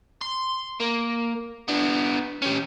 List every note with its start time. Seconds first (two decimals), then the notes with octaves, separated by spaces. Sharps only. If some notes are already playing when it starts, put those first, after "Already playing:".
0.22 C6
0.80 A#3
1.68 B3 D4
2.42 C#4 G4